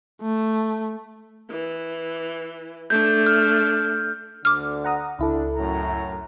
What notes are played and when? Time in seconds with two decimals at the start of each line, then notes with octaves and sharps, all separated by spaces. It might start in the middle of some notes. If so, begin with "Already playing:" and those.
0.22 A3
1.50 E3
2.90 A3 D4 G6
3.27 F6
4.45 D2 D3 D6 F6
4.84 F#5 A#5 D#6
5.19 C#2 D4 E4 A4
5.57 F#2 A2 A#5